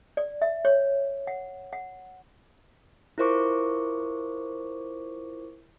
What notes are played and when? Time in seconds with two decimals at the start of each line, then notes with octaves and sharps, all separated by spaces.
0.17 D5
0.42 E5
0.65 C#5
1.27 F#5
1.73 F#5
3.18 E4 F4 A#4 C5 C#6 D6